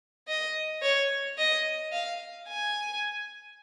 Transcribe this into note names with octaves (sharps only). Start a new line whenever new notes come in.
D#5
C#5
D#5
F5
G#5